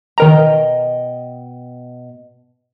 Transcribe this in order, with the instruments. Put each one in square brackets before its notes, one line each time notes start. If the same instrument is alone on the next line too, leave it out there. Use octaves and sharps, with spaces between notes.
[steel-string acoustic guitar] B2 D#5 G5 [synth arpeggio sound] D#3 A#4 A#5